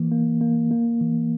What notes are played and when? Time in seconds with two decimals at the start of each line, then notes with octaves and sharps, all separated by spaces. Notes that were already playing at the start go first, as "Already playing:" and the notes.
Already playing: E3 A#3
0.12 A#3
0.41 A#3
0.71 A#3
1.01 E3